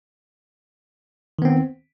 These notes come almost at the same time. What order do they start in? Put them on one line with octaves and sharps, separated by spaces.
D#3 B3 C4